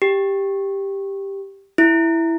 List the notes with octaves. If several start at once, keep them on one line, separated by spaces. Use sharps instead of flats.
G4
E4